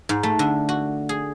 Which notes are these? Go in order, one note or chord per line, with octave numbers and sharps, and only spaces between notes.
G#2
A3
D3
F#4
G#4